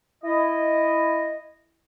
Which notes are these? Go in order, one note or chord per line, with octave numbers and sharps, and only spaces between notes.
E4 D#5